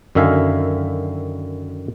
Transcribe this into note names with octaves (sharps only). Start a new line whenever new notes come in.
F#2 D3 D#3 E5 F5 G#5